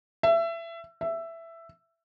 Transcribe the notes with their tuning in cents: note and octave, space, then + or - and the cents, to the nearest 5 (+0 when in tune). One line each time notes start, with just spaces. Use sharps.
E5 +25
E5 +10